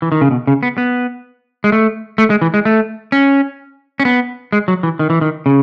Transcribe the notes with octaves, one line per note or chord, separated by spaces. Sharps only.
E3
D#3
C#3
B2
C#3
B3
B3
G#3
A3
A3
G#3
E3
G#3
A3
C#4
C#4
B3
G#3
F#3
E3
D#3
E3
D#3
C#3